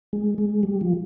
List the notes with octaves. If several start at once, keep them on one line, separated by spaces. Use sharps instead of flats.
G#3
G#3
G3
F3